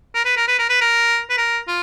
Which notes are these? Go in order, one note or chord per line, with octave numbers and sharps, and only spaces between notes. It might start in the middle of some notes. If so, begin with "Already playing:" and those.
A#4
B4
A#4
B4
A#4
B4
A#4
B4
A#4
F4